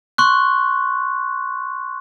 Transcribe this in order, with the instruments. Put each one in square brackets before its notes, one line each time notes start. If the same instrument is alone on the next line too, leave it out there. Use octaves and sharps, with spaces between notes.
[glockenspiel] C6 C#6 F#6